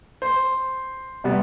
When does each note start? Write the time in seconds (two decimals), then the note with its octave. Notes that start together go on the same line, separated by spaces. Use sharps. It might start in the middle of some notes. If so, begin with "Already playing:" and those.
0.22 C5
1.24 C3 G3 B3